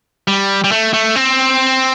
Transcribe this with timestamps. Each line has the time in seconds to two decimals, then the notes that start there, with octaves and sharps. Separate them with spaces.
0.28 G3
0.64 G3
0.71 A3
0.94 A3
1.16 C4